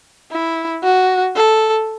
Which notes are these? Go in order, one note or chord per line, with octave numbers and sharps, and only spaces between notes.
E4
F#4
A4